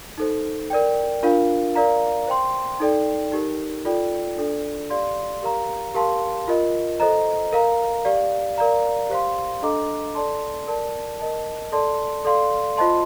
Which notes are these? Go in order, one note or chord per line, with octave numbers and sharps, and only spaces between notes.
D#4 A4 C5
A#4 D5 G5
D4 F4 A#4 F5
A#4 D5 F5 A#5
C5 G5 C6
D#4 A4 D5 G5
D#4 G4 A#4
F4 A4 D5 G5
D4 A4 D5
G4 D5 F5 C6
G4 A#4 F5 A#5
G4 A#4 F5 A5 C6
F4 A#4 D#5
A4 C5 D#5 A#5
A#4 F5 A#5
G4 D5 F5
A#4 D5 F5 A#5
G4 C5 F5 C6
D4 A4 D#5 A#5 D6
A4 D5 A5 C6
A#4 D5 A5
A#4 D#5 A5
A4 D5 A5 C6
A4 D5 F5 C6
F4 C5 D#5 A5 C6